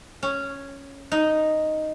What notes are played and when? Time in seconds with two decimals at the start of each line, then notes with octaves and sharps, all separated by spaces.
0.23 C#4
1.12 D#4